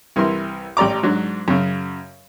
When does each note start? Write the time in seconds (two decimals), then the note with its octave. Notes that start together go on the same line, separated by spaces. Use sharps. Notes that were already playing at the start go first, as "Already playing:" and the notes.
0.16 C2 E3 E4 A#4 C6
0.77 A1 G4 D5 A#5 D6
1.03 G#2 F#3 D4
1.48 F#2 C#3